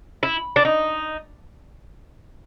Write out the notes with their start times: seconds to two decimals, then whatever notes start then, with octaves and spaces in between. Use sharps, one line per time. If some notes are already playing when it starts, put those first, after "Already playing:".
0.23 E4
0.56 D4
0.65 D#4